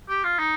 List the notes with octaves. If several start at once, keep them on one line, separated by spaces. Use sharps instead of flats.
G4
F4
D#4